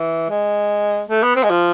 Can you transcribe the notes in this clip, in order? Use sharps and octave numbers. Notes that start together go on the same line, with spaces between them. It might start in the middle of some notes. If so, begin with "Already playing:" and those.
Already playing: E3
G#3
A3
B3
C4
G#3
F3